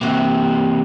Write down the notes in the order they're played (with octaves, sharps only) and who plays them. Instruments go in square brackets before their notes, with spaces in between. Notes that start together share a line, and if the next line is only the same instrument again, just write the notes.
[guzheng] C3 F#4 [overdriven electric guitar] E3 A#3